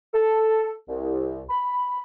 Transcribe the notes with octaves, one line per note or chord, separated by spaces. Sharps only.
A4
C2
B5